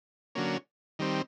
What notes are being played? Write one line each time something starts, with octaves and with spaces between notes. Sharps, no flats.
D3 F#3 A#3 C#4
D#3 G3 C4